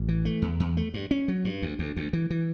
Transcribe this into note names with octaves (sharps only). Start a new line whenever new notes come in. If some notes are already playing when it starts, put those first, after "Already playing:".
Already playing: A1
E3
A3
E2
E2
A3
G2
C#4
F#3
G2
D2
D2
D2
E3
E3